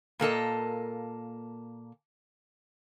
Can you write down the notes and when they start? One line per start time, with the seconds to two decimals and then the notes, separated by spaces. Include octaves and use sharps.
0.20 A#2 A#3 A4 D#5